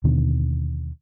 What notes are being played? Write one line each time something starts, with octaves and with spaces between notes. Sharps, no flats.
D#2 B2 D3 D#3